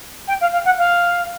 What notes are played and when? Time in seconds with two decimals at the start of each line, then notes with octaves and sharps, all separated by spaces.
0.27 G5
0.41 F5
0.52 F5
0.65 F#5
0.78 F5